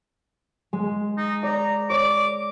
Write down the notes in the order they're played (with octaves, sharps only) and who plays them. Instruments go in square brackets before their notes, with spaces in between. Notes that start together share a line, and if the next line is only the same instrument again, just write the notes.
[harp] G#3
[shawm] D#4
[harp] D5 A#6 [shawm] A#5
[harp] C#5 D5 [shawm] D6